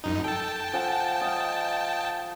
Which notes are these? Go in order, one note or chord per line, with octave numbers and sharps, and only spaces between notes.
F#2 D#4
A4 G5 A5
F3 F#5 G#5
D#5 F5